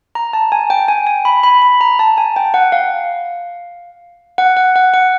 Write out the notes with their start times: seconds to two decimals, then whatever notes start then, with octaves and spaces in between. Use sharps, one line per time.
0.15 A#5
0.33 A5
0.52 G#5
0.70 G5
0.88 G#5
1.07 G#5
1.25 B5
1.43 B5
1.62 B5
1.81 A#5
1.99 A5
2.18 G#5
2.36 G5
2.54 F#5
2.72 F5
4.38 F#5
4.57 F#5
4.76 F#5
4.94 F#5